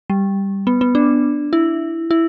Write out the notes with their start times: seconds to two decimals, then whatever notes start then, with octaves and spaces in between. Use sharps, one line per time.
0.10 G3
0.67 B3
0.81 B3
0.95 D4
1.53 E4
2.11 E4